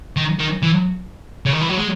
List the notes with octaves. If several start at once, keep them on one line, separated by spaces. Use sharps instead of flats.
D#3
D#3
E3
C#3
D#3
E3
F#3
G#3